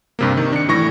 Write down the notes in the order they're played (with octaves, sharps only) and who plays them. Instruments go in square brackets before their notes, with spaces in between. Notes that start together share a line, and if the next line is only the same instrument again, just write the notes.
[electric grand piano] G2 C3 A#3
C3 D#3
D4 C#7
A2 E3 C#6 A#6